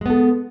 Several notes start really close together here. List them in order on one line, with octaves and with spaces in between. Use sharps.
G#3 B3 A4